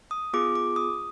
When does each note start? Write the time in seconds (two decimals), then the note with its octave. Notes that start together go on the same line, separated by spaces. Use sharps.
0.11 D#6
0.33 B3 F4 G#4 D6
0.55 D6
0.76 D#6